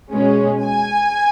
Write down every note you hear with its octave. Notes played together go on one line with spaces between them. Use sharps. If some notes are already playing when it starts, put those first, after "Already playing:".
B2 G#3 C#4
G#5